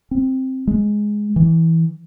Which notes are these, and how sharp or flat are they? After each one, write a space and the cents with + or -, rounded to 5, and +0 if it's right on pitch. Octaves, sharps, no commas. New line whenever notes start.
C4 +5
G#3 +5
E3 -10